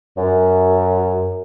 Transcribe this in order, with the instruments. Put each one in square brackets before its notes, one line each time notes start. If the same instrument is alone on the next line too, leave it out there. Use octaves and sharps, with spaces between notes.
[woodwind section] F#2